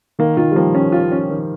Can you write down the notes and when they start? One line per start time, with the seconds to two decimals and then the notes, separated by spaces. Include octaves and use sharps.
0.19 D#3 A#3
0.37 D#3 F4
0.52 G3
0.56 F3 A#3
0.75 C#4
0.92 F4
1.12 C#4
1.30 D#3